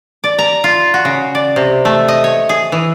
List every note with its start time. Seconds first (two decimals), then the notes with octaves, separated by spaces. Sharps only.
0.24 D5
0.39 A#5
0.64 F4
0.94 F#4
1.05 C#3
1.35 D5
1.56 C3
1.85 A3
2.08 D#5
2.24 C#5
2.49 G#4
2.72 E3